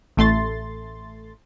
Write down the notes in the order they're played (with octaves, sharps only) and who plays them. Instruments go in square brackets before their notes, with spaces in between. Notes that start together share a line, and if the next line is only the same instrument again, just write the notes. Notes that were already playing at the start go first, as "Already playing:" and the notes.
[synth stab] A1 A3 C6 A6